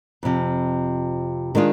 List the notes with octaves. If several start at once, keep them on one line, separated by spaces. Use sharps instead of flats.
F2 C3 F3
D#3 G#3 D4 F4